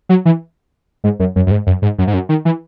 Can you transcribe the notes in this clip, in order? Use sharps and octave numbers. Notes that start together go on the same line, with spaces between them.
F#3
E3
G#2
F#2
F#2
F#2
G#2
F#2
G#2
F#2
G#2
F#2
D#3
E3